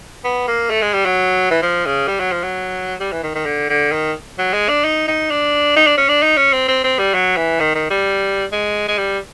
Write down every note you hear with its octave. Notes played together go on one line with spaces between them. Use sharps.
B3
A#3
A3
G#3
G3
F#3
E3
F3
C#3
G3
F#3
F3
F#3
G3
E3
D#3
D#3
D3
D3
D#3
F#3
G#3
D4
D#4
D#4
D4
D#4
D4
C#4
D4
D#4
C#4
C4
C4
C4
G3
F#3
E3
D#3
D#3
G3
G#3
G#3
G3